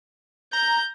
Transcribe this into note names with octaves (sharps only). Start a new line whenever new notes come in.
A#5 G6